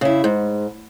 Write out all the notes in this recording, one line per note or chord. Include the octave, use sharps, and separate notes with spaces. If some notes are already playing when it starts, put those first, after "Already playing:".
C#3 E4
G#2